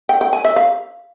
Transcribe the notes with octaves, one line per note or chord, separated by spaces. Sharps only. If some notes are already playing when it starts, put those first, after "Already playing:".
G5
G5
G#5
E5
F5